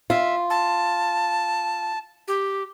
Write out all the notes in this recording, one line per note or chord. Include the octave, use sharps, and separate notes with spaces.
F4 E5
A5
G4